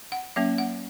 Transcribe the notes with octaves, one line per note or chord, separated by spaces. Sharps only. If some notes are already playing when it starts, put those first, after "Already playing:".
F#5
F#3 A#3 C#4 E5
F#5